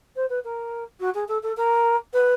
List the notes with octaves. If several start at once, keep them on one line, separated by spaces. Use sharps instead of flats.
C5
B4
A#4
F#4
G#4
A4
A4
A#4
B4